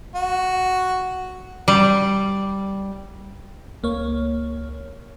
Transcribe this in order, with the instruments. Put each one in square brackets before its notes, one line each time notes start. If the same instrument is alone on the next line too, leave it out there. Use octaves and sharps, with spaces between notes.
[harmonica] F#4
[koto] G3
[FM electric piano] C#2 A#3 C#5